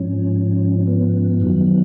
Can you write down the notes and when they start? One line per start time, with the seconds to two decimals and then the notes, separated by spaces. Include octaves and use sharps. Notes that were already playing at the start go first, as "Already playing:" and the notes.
Already playing: G#2 F3 C#4
0.87 B3
1.40 F#2 D#3 F#3